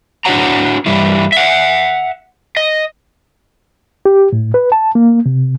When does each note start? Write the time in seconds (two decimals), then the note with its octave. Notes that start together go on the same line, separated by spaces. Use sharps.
0.25 D4 E4 F#4 C#5 F#5 A#5
0.86 G2 E3 G3 E4
1.32 E5 F#5
2.57 D#5
4.05 G4
4.33 A2
4.54 B4
4.72 A5
4.95 A#3
5.26 C3